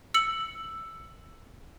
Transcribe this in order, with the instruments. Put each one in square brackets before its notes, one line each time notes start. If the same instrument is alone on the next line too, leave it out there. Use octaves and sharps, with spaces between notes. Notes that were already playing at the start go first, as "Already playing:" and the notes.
[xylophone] E6 C#7 F#7